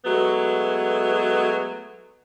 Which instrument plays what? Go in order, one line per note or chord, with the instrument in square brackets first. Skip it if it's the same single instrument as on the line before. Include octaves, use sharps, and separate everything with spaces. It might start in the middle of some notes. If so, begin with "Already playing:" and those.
[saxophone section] F#3 G#3 A3 B3 F#4